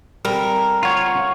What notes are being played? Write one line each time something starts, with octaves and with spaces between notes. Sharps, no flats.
G3 C4 A4 A#4
F4 C#5 F#5